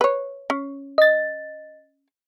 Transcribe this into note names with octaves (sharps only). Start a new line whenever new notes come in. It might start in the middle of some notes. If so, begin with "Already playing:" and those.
B4 C#5
C#4
D#5 A6